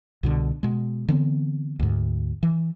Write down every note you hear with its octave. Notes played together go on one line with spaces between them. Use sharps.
C2 B2 D3
B2 G#3
D3 E3 B3 C4
D2 G#2
E3